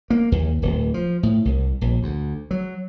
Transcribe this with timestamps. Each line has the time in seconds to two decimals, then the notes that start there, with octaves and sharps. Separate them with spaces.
0.10 A#3
0.32 D#2
0.62 D1
0.94 F3
1.23 A2
1.45 C2
1.81 A#1
2.03 D2
2.51 F#3